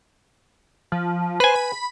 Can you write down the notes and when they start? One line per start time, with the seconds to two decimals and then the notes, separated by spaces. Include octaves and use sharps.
0.92 F3
1.40 B4 C5 G#5
1.55 B5